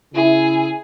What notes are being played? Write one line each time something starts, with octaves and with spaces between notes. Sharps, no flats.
C#3 E4 G#4